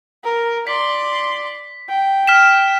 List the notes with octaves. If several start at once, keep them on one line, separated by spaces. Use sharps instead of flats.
A#4
D5 C6 B6
G5
F6 B6 E7